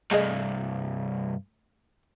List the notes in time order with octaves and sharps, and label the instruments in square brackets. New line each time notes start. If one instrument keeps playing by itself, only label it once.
[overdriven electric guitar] C2 G2 [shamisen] A3 G#4 D#5